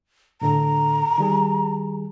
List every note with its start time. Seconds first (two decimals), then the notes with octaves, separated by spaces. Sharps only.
0.41 A2 D3 A4 A#5
1.18 D#3 G3 G#4